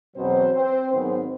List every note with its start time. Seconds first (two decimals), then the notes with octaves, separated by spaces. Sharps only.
0.15 E2 B2 F#3 C4 C5
0.53 C4 C5
0.92 G#2 D#3 F#3 B3 C4 C5